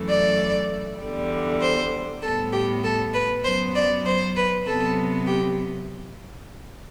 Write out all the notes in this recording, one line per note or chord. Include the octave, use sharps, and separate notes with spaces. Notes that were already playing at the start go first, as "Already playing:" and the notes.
Already playing: F#2 E3 A3
D5
E2 D3 G3
C5
A2 G3 B3 A4
G4
A4
B4
F#2 F#3 B3 C5
D5
C5
B4
C3 F#3 B3 A4
G4